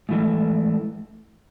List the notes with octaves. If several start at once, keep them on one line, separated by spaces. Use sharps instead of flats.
G#2 E3 A3